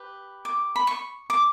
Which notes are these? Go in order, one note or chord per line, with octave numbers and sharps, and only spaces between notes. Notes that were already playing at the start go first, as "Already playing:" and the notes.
Already playing: G4 B4
D6
B5
C#6
D6